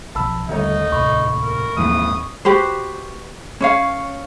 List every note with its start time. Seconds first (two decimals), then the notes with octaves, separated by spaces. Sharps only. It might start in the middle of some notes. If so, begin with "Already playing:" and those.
0.15 B1 B2 F3 A5 B5 E6
0.49 D#1 D3 G3 A3 D#4 C#5
0.92 C#2 A2 C3 B5 C#6
1.43 A#4
1.77 D#1 G#1 E3 F3 G#3 A#3 D#6
2.45 F#4 G4 B4 C5
3.61 C#4 C#5 F5